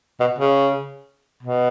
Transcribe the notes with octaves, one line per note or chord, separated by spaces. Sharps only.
B2
C#3
B2